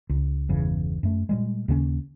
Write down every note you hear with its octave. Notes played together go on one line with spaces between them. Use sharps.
C#2
G1 E2 C#3
F#2 A3
A#2 G3 G#3
D#2 C#3 A#3 C#4